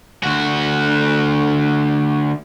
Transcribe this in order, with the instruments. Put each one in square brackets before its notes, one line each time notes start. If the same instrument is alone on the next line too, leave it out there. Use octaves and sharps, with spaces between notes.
[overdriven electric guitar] D2 F#4